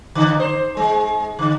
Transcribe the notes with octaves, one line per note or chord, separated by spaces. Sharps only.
D3
C5
G#3
D3